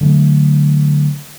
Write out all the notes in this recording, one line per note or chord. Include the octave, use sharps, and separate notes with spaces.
D3 F#3 G#3 A3